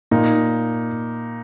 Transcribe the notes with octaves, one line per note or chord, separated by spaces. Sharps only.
A#2 D#4